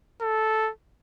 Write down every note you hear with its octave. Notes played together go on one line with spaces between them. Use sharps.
A4